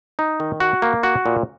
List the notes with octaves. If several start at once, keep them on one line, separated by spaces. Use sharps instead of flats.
D#4
D#3
F#4
A#3
F#4
A#2